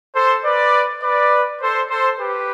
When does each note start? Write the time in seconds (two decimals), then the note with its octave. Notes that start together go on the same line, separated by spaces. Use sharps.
0.15 A4 C5
0.45 B4 D5
1.03 B4 D5
1.62 A4 C5
1.90 A4 C5
2.20 G4 B4